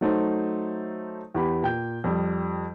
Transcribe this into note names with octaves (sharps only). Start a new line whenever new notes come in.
F#3 A3 D#4 C5
E2 G4 B5
A#2 G5 G6
F2 G3